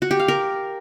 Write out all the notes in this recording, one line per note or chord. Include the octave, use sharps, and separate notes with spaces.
F#4
G4
F5
A#4